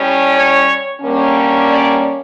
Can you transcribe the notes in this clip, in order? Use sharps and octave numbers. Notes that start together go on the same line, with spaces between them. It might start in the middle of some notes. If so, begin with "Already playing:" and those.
Already playing: A2 G3 C#4
C#5
D3 G3 A#3 C#4
D5